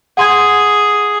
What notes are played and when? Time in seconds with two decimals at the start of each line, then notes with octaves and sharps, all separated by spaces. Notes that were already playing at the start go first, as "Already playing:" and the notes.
0.17 G#4 F#5 C6 G#6